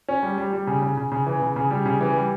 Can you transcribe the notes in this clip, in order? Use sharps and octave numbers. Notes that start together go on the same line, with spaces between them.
C#4
G3
G3
G3
C#3
C#3
C#3
C#3
E3
C#3
C#3
G3
C#3
E3
G3